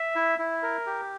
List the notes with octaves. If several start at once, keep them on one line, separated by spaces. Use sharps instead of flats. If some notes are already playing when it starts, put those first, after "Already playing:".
Already playing: E5
E4
E4
A#4
G4